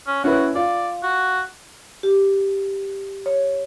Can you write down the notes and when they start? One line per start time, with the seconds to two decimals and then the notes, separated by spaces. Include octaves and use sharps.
0.07 C#4
0.24 C#4 E4 F#4 B4
0.55 F4 D5
1.03 F#4
2.03 G4
3.26 C#5